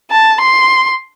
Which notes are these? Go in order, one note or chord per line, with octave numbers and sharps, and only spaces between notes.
A5
C6